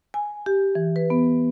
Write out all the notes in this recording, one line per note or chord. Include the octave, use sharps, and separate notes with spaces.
G#5
G4
E3
B4
B3